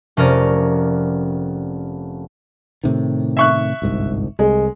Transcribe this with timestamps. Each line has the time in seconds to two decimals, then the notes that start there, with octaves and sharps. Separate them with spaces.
0.17 F1 C#4 A#4 D5
2.84 A2 C3 D#3
3.37 E5 C#6 F#6
3.82 G1 C2 G#2
4.39 C2 G#3